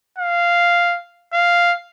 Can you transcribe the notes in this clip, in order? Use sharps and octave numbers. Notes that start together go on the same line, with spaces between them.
F5
F5